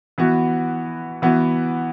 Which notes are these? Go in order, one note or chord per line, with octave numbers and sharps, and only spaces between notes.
E3 B3 F#4
E3 B3 F#4